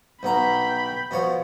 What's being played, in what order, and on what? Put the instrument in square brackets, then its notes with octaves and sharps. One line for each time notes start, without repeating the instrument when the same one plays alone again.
[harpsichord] B1 B2 A#5 [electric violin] G5 B5
[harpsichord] B2 F3 C#5